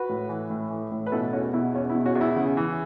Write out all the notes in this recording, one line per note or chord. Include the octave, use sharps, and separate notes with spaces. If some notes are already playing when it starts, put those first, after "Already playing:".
Already playing: F#4 B4
A2
E3
A2
E3
A2
B4
B2 E4 A4
E2 C#4 F#4
B2 E4
E2 C#4
E4
B2
C#4 F#4
E2
E4
C#3
E3